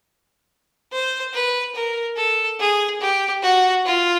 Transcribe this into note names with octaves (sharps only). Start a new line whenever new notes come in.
C5
B4
A#4
A4
G#4
G4
F#4
F4